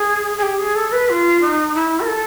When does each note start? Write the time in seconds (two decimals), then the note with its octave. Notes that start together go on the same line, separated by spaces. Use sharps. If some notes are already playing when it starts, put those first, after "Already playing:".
Already playing: G#4
0.37 G#4
0.42 G4
0.59 G#4
0.75 A4
0.92 B4
1.09 F4
1.40 D#4
1.74 E4
2.00 A#4
2.06 A4